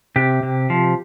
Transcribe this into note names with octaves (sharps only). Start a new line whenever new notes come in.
C3 G4
C3
F3